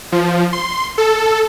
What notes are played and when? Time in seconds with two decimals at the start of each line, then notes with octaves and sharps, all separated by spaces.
0.12 F3
0.53 C6
0.98 A4